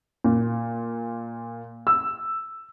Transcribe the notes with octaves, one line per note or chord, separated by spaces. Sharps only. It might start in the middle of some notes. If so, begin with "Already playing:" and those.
A#2
E6